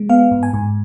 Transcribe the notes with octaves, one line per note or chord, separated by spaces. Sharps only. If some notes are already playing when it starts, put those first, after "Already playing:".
Already playing: G#3
B3 F5
G#2
G#5
G#2